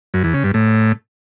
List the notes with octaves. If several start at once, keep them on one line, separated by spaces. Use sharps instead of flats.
F#2
E2
C#3
G2
A2